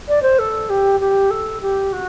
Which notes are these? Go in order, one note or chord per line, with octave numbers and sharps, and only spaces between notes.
D5
C5
A4
G4
G4
A4
G4
F#4